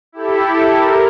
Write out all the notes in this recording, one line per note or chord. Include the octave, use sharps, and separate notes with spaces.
E4 G4 A4
A#4